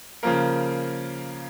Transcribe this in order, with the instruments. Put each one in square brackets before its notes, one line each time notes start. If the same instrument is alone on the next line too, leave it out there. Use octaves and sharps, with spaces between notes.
[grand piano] C#3 F3 A#3 A#4